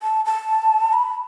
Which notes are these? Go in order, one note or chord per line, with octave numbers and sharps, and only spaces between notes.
A5
A5
B5